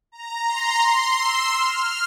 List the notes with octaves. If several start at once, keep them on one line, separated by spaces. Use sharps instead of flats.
A#5
C6
E6
F6